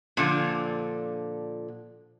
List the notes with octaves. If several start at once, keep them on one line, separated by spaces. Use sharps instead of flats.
A#2 D3 F3